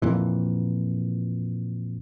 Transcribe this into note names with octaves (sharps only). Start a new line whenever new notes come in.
F2 A#2 E3